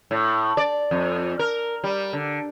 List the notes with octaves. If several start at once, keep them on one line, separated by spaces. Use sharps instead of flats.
A2
D5
F2
A#4
G3
D3